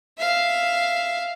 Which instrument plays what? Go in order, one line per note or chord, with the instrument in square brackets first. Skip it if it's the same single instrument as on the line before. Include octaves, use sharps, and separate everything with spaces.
[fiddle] E5 F5